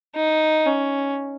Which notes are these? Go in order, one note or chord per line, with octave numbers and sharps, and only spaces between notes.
D#4
C#4